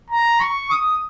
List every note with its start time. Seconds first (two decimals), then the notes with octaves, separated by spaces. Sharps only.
0.10 A#5
0.40 C#6
0.70 D#6